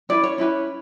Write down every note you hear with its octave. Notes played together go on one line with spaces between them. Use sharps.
C#4 E4 B4 D5
C#5
C#4 E4 G4 B4